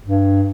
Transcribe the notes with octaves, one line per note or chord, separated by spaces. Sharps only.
G2